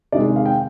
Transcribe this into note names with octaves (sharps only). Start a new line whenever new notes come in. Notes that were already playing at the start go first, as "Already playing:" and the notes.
C3 D#3 G#3 D5
F5
G5